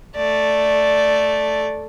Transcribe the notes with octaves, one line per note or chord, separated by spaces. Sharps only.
A3 D5